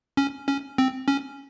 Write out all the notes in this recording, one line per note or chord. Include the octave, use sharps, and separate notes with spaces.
C#4
C#4
C4
C#4